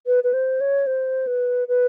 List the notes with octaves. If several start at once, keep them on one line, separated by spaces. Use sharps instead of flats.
B4
B4
C5
C#5
C5
B4
B4